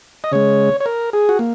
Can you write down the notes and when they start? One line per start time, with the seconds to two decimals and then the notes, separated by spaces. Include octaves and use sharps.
0.24 D#5
0.32 C#3 G#3 C#5
0.80 C#5
0.86 A#4
1.13 G#4
1.29 F#4
1.39 A#3